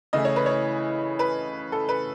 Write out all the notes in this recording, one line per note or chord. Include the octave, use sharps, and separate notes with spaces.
C#3 E3 A3 E4 D#5
C#5
B4
C#5
B4
A4
B4